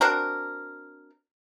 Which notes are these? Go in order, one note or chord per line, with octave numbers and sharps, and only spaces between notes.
C4 D4 F#4 A#4